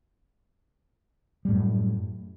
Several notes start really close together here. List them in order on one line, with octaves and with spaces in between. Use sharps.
G3 A2 F#2